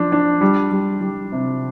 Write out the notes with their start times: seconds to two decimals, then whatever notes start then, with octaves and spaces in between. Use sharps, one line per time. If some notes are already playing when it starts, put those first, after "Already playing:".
Already playing: F3 D4
0.12 D4
0.41 G3
0.71 G3
1.01 G3
1.32 C3